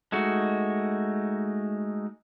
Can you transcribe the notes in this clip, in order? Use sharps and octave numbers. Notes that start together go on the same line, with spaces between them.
G#3 A3 D#4 F#4